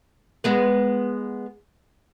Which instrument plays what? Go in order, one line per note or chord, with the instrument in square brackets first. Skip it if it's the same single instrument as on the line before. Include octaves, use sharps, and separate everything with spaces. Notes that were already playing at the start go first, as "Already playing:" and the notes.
[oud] G#3 B3 B4